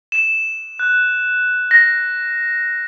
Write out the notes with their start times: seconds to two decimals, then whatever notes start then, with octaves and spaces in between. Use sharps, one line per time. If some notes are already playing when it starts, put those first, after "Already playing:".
0.12 E7
0.79 F#6
1.71 A#6